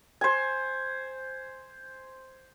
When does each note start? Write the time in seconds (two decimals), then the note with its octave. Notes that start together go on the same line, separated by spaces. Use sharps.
0.21 C5 G#5